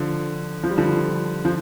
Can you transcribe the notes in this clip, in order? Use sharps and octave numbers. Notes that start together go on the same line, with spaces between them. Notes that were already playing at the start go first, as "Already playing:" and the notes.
Already playing: D3 F3
F3
G3
D3 F3
F3